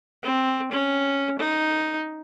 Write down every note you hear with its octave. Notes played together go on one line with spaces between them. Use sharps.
C4
C#4
D#4